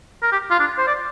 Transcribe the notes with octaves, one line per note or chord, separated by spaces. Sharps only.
A#4
G4
F4
D4
C5
D5